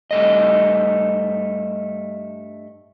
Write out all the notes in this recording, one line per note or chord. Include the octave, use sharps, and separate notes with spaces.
G2 A3 D#5